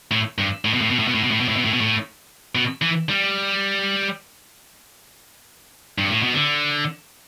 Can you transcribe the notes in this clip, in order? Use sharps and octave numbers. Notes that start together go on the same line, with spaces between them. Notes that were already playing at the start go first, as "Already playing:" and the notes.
A2
G2
A2
B2
A2
B2
A2
B2
A2
B2
A2
B2
A2
B2
A2
B2
A2
B2
E3
G3
G2
A2
B2
D3